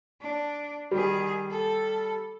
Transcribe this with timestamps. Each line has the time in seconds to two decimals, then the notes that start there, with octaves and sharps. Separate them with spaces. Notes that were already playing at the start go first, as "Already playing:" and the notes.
0.21 D4
0.91 D#3 G3 G#4
1.51 A4